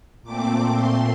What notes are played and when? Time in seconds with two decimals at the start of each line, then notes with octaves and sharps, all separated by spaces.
0.23 A#2 A3 C4 D6
0.73 C6